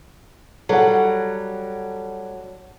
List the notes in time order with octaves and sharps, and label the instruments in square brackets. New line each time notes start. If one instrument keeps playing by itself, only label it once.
[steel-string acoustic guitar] F#3 G3 [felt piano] A4 F#5